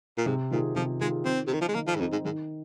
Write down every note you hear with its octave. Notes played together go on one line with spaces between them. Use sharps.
A#2
G#2 C3
A#2 D#3 C4 F4 G#4
C3 F3
D#3 G#3 C4 F4 G#4
D#3 C4
C3
D#3 C4 D#4
F3
G#3
D#3 A#3
F3
G#2
F2 C4 D#4
G#2
G#2 D#3